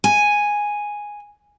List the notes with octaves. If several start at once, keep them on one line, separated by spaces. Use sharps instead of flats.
G#5